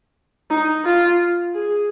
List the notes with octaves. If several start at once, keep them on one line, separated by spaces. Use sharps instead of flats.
D#4
F4
G#4